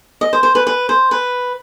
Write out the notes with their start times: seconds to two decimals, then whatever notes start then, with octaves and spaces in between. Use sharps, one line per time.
0.21 D#5
0.33 C5
0.43 C5
0.55 B4
0.67 B4
0.89 C5
1.11 B4